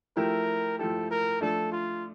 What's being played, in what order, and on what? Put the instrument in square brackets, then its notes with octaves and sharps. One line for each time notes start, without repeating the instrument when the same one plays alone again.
[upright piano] F3 A3 E4 G4 [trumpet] A#4
[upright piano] F3 A3 E4 G4 [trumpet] A4
[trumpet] A#4
[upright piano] F3 A3 D4 [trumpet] A4
[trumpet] F4